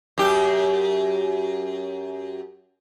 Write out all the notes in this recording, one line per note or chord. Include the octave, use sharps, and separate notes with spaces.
F#2 G4